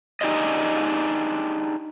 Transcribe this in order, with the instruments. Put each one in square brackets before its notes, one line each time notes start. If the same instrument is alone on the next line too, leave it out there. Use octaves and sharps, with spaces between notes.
[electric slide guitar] D4 D#4 G4 G#4 D5 D#5